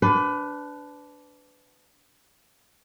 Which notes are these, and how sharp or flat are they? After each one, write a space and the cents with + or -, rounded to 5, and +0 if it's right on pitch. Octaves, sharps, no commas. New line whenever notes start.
D4 -15 B4 +25